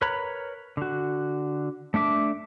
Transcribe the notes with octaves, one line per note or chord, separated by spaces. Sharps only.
A#4 B4 C#5 A#5 B5
D3 F#4
A3 D4 E5 D6